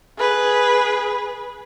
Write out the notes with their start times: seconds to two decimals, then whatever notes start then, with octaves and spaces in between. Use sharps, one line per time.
0.18 G#4 B4